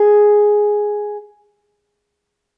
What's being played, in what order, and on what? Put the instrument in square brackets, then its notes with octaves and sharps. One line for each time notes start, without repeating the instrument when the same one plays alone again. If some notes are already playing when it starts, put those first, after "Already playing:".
Already playing: [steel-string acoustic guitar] G#4